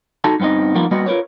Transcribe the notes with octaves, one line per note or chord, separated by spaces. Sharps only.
D#4 F#4 A4 A5
G2 B3 C4 D#4 D#5
F3 G3 A#3 B3 D#4 F4
G3 A#3 B3 F#4 B4 D#5
F4 A#4 B4 C#5